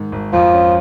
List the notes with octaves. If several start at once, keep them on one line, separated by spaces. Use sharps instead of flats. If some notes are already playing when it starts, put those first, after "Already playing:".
Already playing: G#2 D#3
G#1
F2 F3
C#4